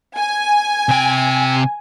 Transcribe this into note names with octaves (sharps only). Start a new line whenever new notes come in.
G#5
C3 G5